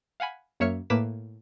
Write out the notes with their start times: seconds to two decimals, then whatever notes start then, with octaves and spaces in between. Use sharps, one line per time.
0.20 F5 F#5 G#5 B5
0.60 F#2 A#3 C#5 E5 F6 C#7
0.90 A2 A#3 B4 D6 B6 E7